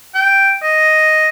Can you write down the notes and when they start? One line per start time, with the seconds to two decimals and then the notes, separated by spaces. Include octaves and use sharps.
0.15 G5
0.63 D#5